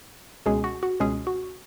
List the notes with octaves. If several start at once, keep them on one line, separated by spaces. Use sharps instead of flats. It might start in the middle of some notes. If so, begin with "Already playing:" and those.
C#2 B2 G#3 C#4 G#4
F#4
F#4
C#2 B2 G#3 C#4 G#4
F#4